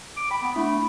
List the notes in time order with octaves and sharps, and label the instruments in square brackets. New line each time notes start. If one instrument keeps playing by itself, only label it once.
[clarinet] D6
[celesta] G5 [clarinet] B5
[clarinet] B3
[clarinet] A3 [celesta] D4 E4 B5